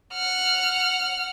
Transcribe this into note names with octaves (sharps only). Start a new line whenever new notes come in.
F#5 F6